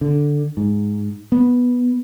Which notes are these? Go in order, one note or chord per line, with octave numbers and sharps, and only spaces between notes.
D3
G#2
B3